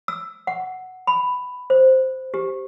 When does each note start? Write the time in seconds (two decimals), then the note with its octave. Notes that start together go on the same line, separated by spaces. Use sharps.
0.08 E6
0.47 F#5
1.07 B5
1.70 C5
2.34 G4